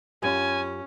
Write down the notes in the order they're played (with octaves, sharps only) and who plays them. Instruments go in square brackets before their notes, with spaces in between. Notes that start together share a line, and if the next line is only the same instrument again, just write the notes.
[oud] F#2 F4 G4 [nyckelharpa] C#4 [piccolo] G#5